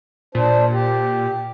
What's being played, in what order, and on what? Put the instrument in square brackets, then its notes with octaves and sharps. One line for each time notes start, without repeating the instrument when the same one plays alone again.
[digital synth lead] A#2 [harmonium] D4 C5
[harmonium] G4